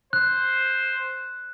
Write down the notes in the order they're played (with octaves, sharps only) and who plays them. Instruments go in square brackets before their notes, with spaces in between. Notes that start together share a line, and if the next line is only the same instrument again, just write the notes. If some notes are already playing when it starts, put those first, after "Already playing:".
[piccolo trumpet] C5 [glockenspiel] F#6